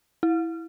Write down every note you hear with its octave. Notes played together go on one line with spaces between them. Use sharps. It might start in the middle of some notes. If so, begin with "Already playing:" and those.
E4